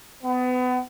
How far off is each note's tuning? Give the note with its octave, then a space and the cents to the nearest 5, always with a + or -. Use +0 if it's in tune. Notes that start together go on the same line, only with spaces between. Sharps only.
B3 +30